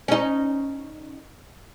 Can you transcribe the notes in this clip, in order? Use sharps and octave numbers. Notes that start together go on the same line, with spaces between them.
C#4 D#4